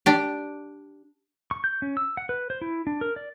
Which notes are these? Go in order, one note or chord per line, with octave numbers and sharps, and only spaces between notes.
D4 G4
C#6
G6
C#4
E6
F#5
B4
C5
E4
D4
A#4
D5